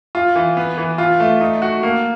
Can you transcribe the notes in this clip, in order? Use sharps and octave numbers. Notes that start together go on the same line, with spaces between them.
F4
E3
B3
E3
F4
A3
D#4
F#4
A#3